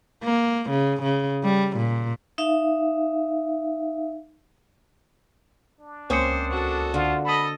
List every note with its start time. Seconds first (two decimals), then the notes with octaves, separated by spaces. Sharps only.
0.23 A#3
0.70 C#3
1.02 C#3
1.44 G3
1.77 A#2
2.38 D#4 E5 F5
5.80 D4
6.10 C#2 A#3 C4 C#4 C5 D#6 C#7
6.51 F#4 A4
6.94 D3 F4
7.25 A4 D#5 B5